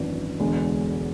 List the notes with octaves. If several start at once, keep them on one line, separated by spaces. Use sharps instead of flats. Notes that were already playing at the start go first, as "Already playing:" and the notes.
Already playing: G#1 F#2 E3 B3 D4
E1 E2 D3 G#3